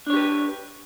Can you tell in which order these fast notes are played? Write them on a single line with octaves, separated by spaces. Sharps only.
D4 C#5 G4 B4